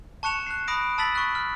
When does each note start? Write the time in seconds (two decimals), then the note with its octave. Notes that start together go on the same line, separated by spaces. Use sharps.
0.23 A5 C#6 F#6 C#7 E7 F7
0.47 F#6 C7
0.68 B5 D#6 F#6 A#6 D7
0.98 A5 B5 E6 A6 B6 F#7
1.15 C#6 F#6
1.35 F6